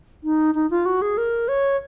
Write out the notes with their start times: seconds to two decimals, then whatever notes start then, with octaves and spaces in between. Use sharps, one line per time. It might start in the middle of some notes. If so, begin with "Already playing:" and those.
0.24 D#4
0.55 D#4
0.71 F4
0.86 F#4
1.02 G#4
1.18 A#4
1.48 C#5